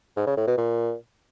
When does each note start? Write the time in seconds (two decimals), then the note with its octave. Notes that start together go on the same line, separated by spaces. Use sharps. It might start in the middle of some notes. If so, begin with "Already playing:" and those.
0.16 G#2
0.27 C#3
0.37 A2
0.47 B2
0.58 A#2